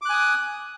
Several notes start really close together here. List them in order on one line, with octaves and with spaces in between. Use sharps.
D6 F#6 G#5 D#6